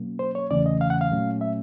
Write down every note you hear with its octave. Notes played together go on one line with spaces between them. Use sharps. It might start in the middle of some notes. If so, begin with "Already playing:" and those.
Already playing: B2 F#3 A#3 C#4
C5
C#5
E2 C#3 E3 A3 C#4 D5
D#5
F5
F#5
F5
A#2 F#3 A3 C#4
E5